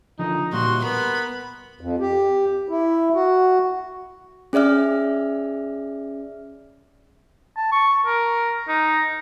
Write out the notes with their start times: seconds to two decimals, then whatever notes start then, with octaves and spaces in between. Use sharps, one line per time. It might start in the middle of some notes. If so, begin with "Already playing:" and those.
0.19 D3 F3 D#4
0.53 A#2 G3 F#4 C6
0.84 B3 A#4 B5
1.81 F2
2.00 G4
2.69 E4
3.14 F#4
4.53 C#4 G#4 D5 E5 F6
7.57 A5
7.72 C#6
8.06 A#4
8.68 D#4